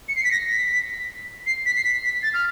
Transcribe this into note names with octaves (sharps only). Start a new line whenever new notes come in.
C#7
C7
B6
A#6
B6
C7
B6
C7
B6
B6
A6
F6